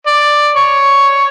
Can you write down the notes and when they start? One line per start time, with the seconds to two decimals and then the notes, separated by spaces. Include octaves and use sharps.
0.07 D5
0.56 C#5